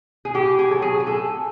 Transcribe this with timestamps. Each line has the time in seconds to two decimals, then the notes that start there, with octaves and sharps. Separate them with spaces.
0.25 G#4
0.34 A2 G4
0.59 G#4
0.71 F#3 B3 A4
0.82 G#4
1.00 G#4
1.06 A2 A4